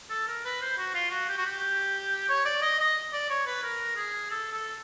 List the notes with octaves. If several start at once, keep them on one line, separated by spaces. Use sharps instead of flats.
A4
A#4
B4
C5
F#4
F4
F#4
G4
F#4
G4
C#5
D5
D#5
D#5
D5
C#5
B4
A#4
G#4
A4
A4